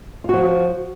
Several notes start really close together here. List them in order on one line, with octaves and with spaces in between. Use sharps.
F4 F#4 F3